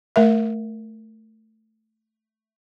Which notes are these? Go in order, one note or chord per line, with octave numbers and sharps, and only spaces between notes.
A3 A#4 E5